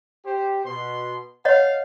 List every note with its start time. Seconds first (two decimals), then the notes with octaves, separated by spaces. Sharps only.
0.24 G4 C5
0.65 B2 C6
1.45 C#5 D#5 F5 F#5